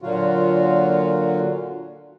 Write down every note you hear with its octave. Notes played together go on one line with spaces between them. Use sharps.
A#2 D3 F#3 F4 F#4